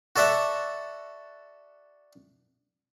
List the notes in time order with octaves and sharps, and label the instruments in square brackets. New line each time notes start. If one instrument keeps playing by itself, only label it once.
[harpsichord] F#4 A4 D5 E5 F#5